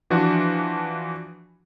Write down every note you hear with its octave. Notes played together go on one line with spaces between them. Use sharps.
E3 F3 D4 F#4